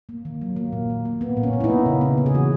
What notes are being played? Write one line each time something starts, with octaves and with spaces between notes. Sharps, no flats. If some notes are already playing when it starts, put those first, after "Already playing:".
A#3
D#3
F#3
A#3
A#2
A#2
A#3
A#3 B3
A#2
C#4
A#2
E4
B3 D#4
A#3
C#3
B3
C#3
G#4
E3 F#4